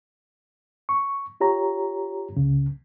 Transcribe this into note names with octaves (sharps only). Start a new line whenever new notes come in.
C#6
F4 G4 C#5 A#5
C#2 C#3